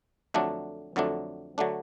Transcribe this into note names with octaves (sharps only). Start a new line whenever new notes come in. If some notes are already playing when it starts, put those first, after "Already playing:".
F2 D3 F#3 A3 D4
F2 D3 F#3 A3 D4
D3 F#3 A3 D4